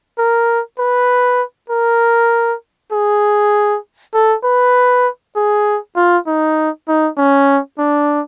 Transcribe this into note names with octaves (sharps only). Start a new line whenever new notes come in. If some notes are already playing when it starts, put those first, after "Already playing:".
A#4
B4
A#4
G#4
A4
B4
G#4
F4
D#4
D#4
C#4
D4